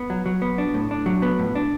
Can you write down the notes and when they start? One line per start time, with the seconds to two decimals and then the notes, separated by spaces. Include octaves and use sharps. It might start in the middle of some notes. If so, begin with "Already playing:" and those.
Already playing: B3
0.10 F#3
0.26 F#3
0.42 B3
0.58 D4
0.74 A2
0.91 D4
1.06 F#3
1.22 B3
1.39 A2
1.55 D4